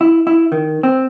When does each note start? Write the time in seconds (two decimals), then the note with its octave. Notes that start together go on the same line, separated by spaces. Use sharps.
0.01 E4
0.27 E4
0.52 D#3
0.83 C4